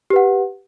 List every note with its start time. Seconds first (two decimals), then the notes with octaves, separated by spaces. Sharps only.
0.10 G4
0.13 B4
0.16 F#5